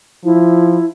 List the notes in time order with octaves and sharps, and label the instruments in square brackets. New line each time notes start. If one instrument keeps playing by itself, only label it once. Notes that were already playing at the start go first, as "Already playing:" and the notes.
[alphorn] F3 [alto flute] E4